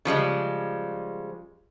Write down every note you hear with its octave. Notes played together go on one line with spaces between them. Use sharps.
C#3 F3 G3 G#3